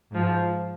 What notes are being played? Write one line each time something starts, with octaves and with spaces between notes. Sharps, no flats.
G#2 F3